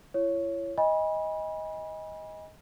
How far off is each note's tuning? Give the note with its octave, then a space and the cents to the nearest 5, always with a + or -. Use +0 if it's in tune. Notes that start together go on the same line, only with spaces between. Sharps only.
E4 +40 C#5 +0
D#5 +15 G#5 -30 B5 -30